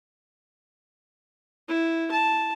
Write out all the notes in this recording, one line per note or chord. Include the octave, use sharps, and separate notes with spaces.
E4
A5